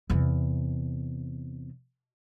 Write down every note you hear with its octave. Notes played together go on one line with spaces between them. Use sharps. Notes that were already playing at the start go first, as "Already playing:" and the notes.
E2 C3